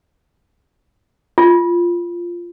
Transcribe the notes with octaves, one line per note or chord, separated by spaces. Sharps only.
F4